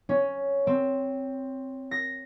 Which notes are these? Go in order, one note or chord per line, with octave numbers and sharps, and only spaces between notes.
C#4
C4
A#6